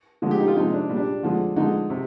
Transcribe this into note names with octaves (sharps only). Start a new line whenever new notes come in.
D3 F3 G#3
G4
D#4
F4
C3 F3 G#3 D#4
D4
A#2 G3
D4
D3 F3 G#3
D3 F3 G#3 D#4
C3